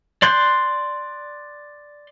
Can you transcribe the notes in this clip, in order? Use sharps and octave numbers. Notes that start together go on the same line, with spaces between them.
D5 C6 F#6 G6